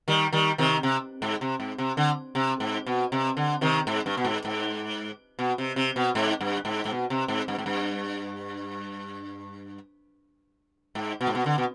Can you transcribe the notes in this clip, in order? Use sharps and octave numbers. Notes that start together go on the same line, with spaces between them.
D#3 G3
D#3 G3
C3 D#3
C3
G#2
C3
G#2
C3
D3
C3
G#2
B2
C3
D3
C3 D#3
G#2
G2
B2
G#2
G#2
B2
C3
C3
B2
G#2
G2
G#2
G#2
B2
C3
G#2
G2
G#2
G2
G#2
B2
G#2
B2
D3
B2